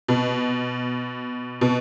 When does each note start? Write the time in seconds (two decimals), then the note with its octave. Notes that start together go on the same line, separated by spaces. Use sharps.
0.08 B2
1.61 B2